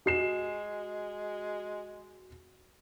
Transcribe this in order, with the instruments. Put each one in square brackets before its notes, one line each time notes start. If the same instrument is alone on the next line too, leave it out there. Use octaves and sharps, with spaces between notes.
[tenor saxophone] G#3 [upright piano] F#4 C7 E7